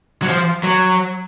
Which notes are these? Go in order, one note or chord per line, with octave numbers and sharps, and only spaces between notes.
F#3
F3
F#3